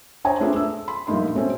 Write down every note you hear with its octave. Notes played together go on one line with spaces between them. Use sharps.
D4 C5 C#5 G#5 A#5
A3 C4 D4 F4 G#4 B4
A3 E6
B5 C6
A#1 G2 A3 A#3 D#4 C6
B2 A3 C4 C#4 A4